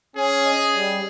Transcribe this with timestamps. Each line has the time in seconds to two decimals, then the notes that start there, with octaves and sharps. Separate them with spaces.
0.16 C#4 G#4
0.45 D#5
0.74 G3